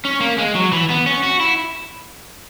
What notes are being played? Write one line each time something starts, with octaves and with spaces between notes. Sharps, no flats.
C#4
A#3
G#3
F#3
E3
B3
C#4
F#4
E4